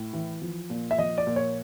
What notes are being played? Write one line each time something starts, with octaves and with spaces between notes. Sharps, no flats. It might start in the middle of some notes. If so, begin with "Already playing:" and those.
Already playing: A2
E3
F3
A#2
E5
F3 D#5
D5
A#2
C#5